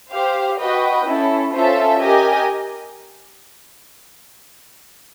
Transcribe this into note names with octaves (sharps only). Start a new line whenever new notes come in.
G4 C5 F5
F#4 B4 D#5 G5
C#4 E4 A4
C#4 F4 A4 C5 E5
G4 A#4 D#5 G#5